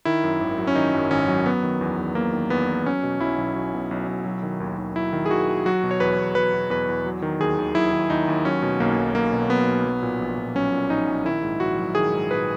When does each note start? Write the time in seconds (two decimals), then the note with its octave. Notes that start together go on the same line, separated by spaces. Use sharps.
0.05 D#3 E4
0.24 F#2
0.41 G#1
0.58 F#3
0.67 C#4
0.75 D#3 D#4
0.94 F#2
1.11 G#1 C#4
1.28 F#3
1.46 F#3 B3
1.63 D#3
1.81 E2
1.98 E2
2.15 F#3 A#3
2.33 D#3
2.50 E2 B3
2.68 E2
2.86 F#3 C#4
3.03 B2
3.20 B1 E4
3.38 B1
3.55 F#3
3.74 B2
3.91 B1
4.08 B1
4.26 F#3
4.43 D#3
4.60 D#2
4.78 D#2
4.95 F#3 E4
5.13 D#3
5.26 G#4
5.31 D#2 F#4
5.48 D#2
5.66 F#3 F#4
5.83 B2
5.91 C#5
6.00 E2 B4
6.18 E2
6.35 F#3 B4
6.53 B2
6.70 E2 B4
6.89 E2
7.06 F#3
7.22 D#3
7.40 D#2 G#4
7.58 D#2
7.75 F#3 E4
7.92 D#3
8.10 D#2 D#4
8.28 D#2
8.45 F#3 C#4
8.63 B2
8.80 B1 A#3
8.98 B1
9.15 F#3 A#3
9.33 B2
9.50 B1 B3
9.67 B1
9.85 F#3
10.02 A#2
10.20 A#1
10.37 A#1
10.55 F#3 C#4
10.73 A#2
10.90 A#1 D#4
11.08 A#1
11.25 D#3 E4
11.43 G#2
11.60 A#1 F#4
11.78 F#3
11.95 D#3 G#4
12.12 G#2
12.30 A#1 B4